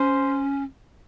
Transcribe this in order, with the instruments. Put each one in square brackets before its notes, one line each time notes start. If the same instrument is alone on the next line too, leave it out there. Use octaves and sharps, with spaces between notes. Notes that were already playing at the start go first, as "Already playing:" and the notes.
Already playing: [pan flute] C#4 [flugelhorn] C5